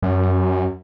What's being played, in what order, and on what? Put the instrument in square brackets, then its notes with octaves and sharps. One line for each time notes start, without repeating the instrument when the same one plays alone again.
[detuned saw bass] F#2